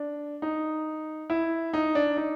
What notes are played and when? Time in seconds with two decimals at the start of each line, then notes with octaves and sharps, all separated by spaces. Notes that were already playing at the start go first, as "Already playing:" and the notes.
Already playing: D4
0.42 D#4
1.30 E4
1.73 D#4
1.95 D4
2.17 D#4